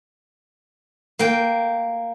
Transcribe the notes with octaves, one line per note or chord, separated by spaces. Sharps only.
A#3 G5